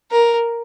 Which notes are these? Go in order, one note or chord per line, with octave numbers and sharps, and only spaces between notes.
A#4